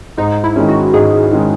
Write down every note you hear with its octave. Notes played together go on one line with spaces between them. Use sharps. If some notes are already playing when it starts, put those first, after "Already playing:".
G#2 D#4
E4
D#3 G#3 C#4
F#4
G#2 G#4
D#3 G#3 C#4